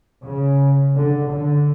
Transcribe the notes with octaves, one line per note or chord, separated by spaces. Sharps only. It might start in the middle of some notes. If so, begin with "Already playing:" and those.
C#3
D3
D3